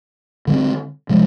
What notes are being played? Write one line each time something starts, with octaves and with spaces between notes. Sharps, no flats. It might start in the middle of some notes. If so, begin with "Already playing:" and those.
D3 G3 C4
C3 F3 G#3